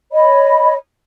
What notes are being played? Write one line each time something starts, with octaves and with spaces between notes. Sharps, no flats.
C#5 D#5 B5